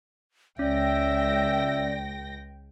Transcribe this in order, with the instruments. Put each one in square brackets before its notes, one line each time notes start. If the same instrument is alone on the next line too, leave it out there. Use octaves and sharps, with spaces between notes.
[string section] C#2 G5 A#6 [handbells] C#4 [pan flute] D5 [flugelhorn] E5